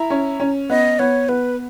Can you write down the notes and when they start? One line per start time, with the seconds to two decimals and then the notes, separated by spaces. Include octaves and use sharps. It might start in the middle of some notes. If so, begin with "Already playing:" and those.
Already playing: E4 A#5
0.10 C#4
0.40 C#4
0.70 B3 D#5
0.99 B3 C#5
1.29 B3 B4